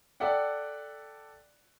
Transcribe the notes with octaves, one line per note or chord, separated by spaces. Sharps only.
A4 D5 E5 F#5 G5